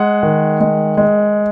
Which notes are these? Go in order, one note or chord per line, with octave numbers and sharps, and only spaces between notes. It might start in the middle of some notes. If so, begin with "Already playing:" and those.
Already playing: G#3 F#5
D#3
G#3
G#3